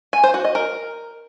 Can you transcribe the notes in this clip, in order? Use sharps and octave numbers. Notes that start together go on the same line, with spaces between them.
G#5
C5
F#4
D#5
A#4